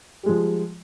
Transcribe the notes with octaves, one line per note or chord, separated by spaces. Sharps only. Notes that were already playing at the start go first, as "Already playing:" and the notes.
F3 G3 G#3